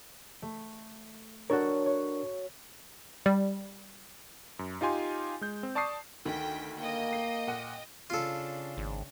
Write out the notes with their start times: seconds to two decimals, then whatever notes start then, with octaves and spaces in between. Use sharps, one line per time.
0.42 A3
1.50 D4 F#4 A4 A#4 C#5
1.86 C#5
3.26 G3
4.59 F#2
4.81 D#4 F4 G4 G#5 C6
5.41 G#3 G6
5.63 C4
5.75 D5 A5 C#6 D#6 C7
6.25 D2 D#3 G5 B6
6.77 A#3 D#5 G5
7.13 C7
7.47 A#2 F#5 D#7
8.10 C#3 D4 F4 A4
8.77 G#1